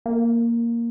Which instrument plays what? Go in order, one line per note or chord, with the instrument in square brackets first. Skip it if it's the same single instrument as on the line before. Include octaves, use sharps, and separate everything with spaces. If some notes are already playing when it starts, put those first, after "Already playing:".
[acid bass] A#3